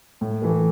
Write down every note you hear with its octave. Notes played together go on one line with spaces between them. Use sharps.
A2
E3 A3